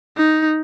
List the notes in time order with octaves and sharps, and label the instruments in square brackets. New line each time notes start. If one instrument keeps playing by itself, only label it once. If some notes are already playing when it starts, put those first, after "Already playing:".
[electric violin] D#4